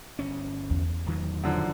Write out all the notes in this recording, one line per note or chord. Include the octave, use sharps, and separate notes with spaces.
G1 C#4
E2
D1 D#3 F#3
F#2 D3 F3